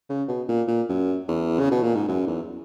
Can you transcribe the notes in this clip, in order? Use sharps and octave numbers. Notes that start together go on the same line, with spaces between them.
C#3
B2
A#2
A#2
F#2
E2
C#3
B2
A#2
G#2
F#2
E2